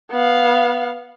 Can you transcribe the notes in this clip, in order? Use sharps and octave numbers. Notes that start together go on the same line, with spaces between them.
B3 F5